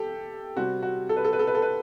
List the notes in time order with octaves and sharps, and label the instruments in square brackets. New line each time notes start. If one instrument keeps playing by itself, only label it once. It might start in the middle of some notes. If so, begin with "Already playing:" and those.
Already playing: [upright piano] G4 A4
C3 G3 C4 F#4
F#4
A4
B4
A4
B4
A4
B4
A4
B4